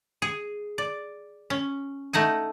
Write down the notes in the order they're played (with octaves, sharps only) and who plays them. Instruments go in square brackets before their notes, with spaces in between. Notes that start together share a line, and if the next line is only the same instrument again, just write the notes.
[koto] G#4
D5
C#4
A3 D#4 F#5 G#5